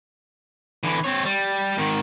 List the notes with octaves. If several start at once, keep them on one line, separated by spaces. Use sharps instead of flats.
D3 E3
C4 C#5
G3
G#2 D#3